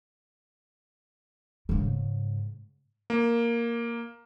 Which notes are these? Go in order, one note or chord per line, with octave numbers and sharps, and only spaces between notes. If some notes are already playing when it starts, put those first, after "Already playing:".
G#2 C#3
A#3